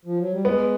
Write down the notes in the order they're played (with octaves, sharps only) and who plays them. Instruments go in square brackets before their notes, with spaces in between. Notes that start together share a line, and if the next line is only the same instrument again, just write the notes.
[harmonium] F3
F#3
G3
[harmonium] G#3 [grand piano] B3